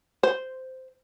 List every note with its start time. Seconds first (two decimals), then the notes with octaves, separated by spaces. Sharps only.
0.23 C5